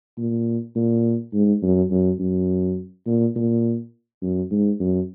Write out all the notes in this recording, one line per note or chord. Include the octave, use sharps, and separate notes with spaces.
A#2
A#2
G#2
F#2
F#2
F#2
A#2
A#2
F#2
G#2
F#2